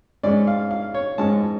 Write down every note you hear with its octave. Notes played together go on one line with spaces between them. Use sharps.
G#2 G#3 C#4 D5
F5
F5
C#5
G#2 G#3 C#4 A5